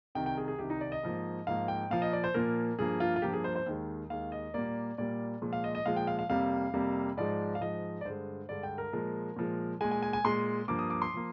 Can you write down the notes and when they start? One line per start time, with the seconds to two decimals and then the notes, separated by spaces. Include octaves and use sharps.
0.15 C2 C3 D#3 G5
0.26 G5
0.38 G#4
0.48 G#4
0.59 C2 C3 D#3 G4
0.70 D#4
0.81 D5
0.92 D#5
1.03 G#2 F3 A#3
1.47 G#2 F3 A#3 F5
1.68 G5
1.90 A#2 F3 A#3 F5
2.02 D#5
2.13 D5
2.24 C5
2.34 A#2 F3 A#3 A#4
2.79 G2 F3 A#3 G#4
3.00 F4
3.16 F4
3.22 G2 F3 A#3 G4
3.33 G#4
3.44 C5
3.56 C5
3.66 D#2 D#3 G#3
4.10 D#2 D#3 G#3 F5
4.32 D#5
4.54 A#2 G3 A#3 D5
4.98 A#2 G3 A#3 D5
5.42 A#2 F3 G#3
5.53 F5
5.64 D#5
5.75 D#5
5.86 A#2 F3 G#3 F5
5.96 G5
6.07 F5
6.19 F5
6.29 F2 C3 G3 A#3 F5
6.73 F2 C3 G3 A#3
7.17 G#2 F3 G#3 D5
7.55 F5
7.61 G#2 F3 G#3 D#5
8.01 D5
8.05 G2 D3 G#3 C5
8.49 G2 D3 G#3 D5
8.63 G5
8.78 A#4
8.93 A#2 F3 G#3
9.36 A#2 F3 G#3
9.81 A#2 G#3 G#5
9.91 G#5
10.03 G#5
10.13 G#5
10.24 A#2 G#3 C6
10.68 G2 F3 A#3 D6
10.79 D#6
10.90 D6
11.02 C6
11.14 F3 A#3